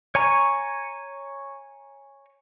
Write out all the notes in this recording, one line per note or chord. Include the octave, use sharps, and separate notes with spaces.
C#5 G#5 A#5 C#6